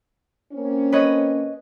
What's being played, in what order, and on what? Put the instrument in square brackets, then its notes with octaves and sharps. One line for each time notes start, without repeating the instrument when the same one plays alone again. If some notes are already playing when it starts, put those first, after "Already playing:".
[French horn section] A#3 C4 C#4
[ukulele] B4 C#5 D#5